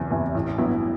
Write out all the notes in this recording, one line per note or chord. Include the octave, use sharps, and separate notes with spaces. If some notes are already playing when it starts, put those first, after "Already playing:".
Already playing: F#1 E2 C3 E3
E2 C3 E3
A1
G2 F#3 B3 E4